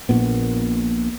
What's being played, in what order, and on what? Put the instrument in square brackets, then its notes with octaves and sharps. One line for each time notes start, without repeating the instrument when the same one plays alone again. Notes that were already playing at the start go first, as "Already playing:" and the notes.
[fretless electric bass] A#1 A#2 B3